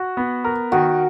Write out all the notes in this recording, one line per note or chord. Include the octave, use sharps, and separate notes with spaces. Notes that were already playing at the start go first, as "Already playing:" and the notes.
Already playing: F#4
B3
A#4
D#3 F#4